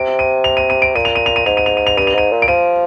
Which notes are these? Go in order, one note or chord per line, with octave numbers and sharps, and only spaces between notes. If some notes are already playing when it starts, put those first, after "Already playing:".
Already playing: C3 D7
D#7
F7
D#7
D#7
D7
A#2 D#7
F7
D#7
F7
D#7
G#2 F7
D#7
F7
D#7
F7
G2 D#7
F7
G#2 D#7
A#2
D7
F3 D#7